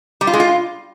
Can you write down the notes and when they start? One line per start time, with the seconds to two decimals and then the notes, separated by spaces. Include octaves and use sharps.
0.21 G3
0.27 F4
0.34 G#3
0.40 F4